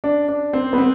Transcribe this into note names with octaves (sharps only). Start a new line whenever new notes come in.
D4
D4
C4
B3
C4